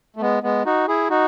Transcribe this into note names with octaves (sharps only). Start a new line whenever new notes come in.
A3
G#3 B3
G#3 B3
D#4 F#4
E4 G#4
D#4 F#4